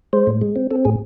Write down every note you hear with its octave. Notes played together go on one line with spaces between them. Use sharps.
G#3 C5
A2
G#3
C4
C4 A4
A2 G#4